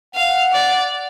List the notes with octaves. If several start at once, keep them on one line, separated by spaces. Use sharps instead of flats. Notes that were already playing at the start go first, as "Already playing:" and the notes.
F5 F#5
D5